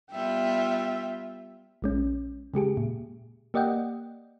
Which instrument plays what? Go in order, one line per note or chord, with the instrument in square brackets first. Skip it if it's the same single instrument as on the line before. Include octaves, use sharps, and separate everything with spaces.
[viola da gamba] G3 B3 F4 [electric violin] E5 G5
[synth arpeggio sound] A#1 G#3 C#4
C#3 G#3 G4 G#4
A#2
A#3 G4 D5 D#5 F#5 G5